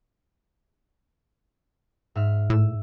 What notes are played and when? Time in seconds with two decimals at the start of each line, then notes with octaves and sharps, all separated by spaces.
2.15 G#2 E5 F6
2.50 A2 E6